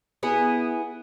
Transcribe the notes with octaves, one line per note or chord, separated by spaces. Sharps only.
B3 E4 G#4